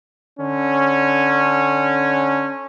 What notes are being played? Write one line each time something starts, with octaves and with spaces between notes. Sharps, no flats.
D3 C#4